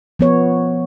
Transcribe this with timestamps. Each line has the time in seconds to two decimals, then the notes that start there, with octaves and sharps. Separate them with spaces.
0.19 F3 B3 C#5